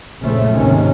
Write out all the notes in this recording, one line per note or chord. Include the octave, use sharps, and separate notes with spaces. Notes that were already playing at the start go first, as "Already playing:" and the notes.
A#1 F#2 C#3 F3 A3
D#2 G#2 C3 D#3 C#4